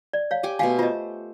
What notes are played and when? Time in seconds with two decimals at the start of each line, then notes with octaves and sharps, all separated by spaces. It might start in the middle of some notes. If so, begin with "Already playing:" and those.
0.13 D5
0.31 C#5 F5
0.43 G4 G5 G#5
0.59 B2 A3 F5 G#5 C6
0.79 F4 C5 D#5